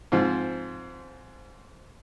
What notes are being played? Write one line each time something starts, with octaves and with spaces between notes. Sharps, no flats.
G#2 F3 C4